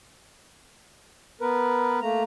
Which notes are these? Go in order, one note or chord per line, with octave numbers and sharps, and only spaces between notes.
B3 A#4 B4
A3 A#3 A#5